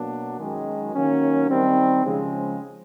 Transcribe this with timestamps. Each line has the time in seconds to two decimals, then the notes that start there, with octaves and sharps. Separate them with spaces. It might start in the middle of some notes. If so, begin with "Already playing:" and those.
Already playing: B2 F#3 A#3 D4
0.39 F#2 D#3 G#3
0.94 D#3 F#3 A#3 C#4
1.49 D#3 G3 C4
2.05 C#3 F3 G#3